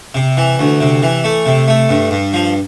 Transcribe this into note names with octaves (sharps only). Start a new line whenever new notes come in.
C3
E3
D2
C3
E3
A3
C3
A3
G2
G2
F3